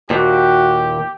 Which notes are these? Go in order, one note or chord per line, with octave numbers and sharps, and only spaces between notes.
D#2 A#2 F#4 G4